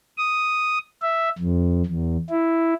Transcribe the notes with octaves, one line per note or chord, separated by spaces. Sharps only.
D#6
E5
F2
E2
E4